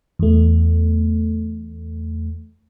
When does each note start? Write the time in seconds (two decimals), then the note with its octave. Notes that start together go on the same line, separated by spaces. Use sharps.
0.19 E2 A3